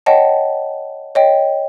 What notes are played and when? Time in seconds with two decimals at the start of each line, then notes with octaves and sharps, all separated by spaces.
0.06 C#5 D#5 F#5 G5 A5
1.15 C#5 D#5 G5